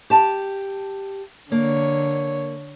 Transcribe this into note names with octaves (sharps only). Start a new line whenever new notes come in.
G4 A5
D3 A#3 C#5